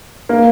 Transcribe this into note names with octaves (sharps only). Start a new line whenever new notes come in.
A#3